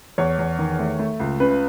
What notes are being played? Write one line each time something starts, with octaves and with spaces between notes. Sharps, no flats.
E2 C#5
E2
D#3
A3
A3
C#2
C#3 B4